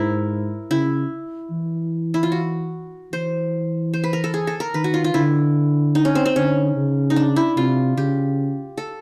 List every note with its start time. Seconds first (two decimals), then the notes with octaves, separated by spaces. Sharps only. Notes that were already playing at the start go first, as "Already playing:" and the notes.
Already playing: G#2 E4 A#4 C5
0.70 C#3 E4
1.51 E3
2.14 E4
2.23 F4
2.32 F#4
3.13 E3 C5
3.94 C5
4.04 B4
4.13 A#4
4.24 A4
4.34 G#4
4.47 A4
4.60 A#4
4.74 D#3 B4
4.84 F#4
4.94 F4
5.04 F4
5.14 D3 E4
5.95 D#4
6.05 C#4
6.15 C4
6.26 C4
6.36 D3 C#4
6.76 C#3
7.10 D#4
7.16 D4
7.36 E4
7.57 C3 F4
7.97 C#3 G4
8.78 A4